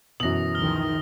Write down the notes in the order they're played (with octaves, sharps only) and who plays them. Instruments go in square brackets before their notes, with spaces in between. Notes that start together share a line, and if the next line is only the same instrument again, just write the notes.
[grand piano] F#2 F#7 [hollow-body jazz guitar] B2 E3 [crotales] D#6 A#6
[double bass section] C#2 D#3 F3 [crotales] F6 G7